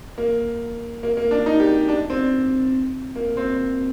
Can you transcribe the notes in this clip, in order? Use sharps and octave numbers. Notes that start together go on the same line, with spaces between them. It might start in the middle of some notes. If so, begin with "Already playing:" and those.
A#3
A#3
A#3
D4
D#4
G4
D4
C4
A#3
C4